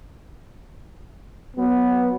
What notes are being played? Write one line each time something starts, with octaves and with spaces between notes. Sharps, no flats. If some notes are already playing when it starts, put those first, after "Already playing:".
F#3 B3